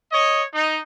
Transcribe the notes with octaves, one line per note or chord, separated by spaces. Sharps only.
C#5 D#5
D#4